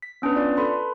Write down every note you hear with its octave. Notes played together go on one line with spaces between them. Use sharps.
B6
B3 C#4 D4 B4
F4 D5
A4 B4 B5 C6